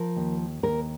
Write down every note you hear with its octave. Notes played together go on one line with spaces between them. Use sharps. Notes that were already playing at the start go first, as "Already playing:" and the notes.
Already playing: F3 A#4
D#2
D#2 A#4